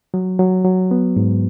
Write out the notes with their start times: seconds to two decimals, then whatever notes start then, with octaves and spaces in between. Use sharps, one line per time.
0.14 F#3
0.39 F#3
0.65 F#3
0.91 B3
1.16 G#2